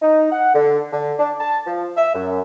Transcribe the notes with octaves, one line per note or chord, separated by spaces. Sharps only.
D#4
F#5
D3
D3
D4
A5
F3
E5
F#2